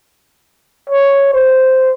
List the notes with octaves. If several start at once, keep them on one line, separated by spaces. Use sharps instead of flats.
C#5
C5